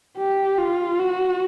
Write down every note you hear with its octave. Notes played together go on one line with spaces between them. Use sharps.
G4
F4
F#4